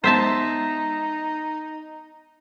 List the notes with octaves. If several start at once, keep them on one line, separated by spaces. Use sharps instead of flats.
G#3 B3 D#4 C5 E5 A5